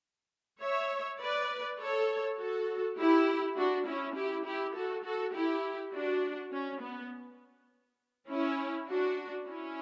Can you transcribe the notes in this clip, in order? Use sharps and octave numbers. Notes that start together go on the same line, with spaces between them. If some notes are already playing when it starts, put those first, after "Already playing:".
C#5 E5
B4 D5
A4 C#5
F#4 A4
E4 G4
D4 F#4
C#4 E4
E4 G4
E4 G4
F#4 A4
F#4 A4
E4 G4
D4 F#4
C#4
B3
C#4 E4
D4 F#4
C#4 E4